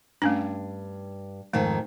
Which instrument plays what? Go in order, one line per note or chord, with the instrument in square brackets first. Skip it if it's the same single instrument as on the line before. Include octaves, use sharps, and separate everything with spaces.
[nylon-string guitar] G2 [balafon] A3 C#4 D4
[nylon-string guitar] F2 G#2 D#3 [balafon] A3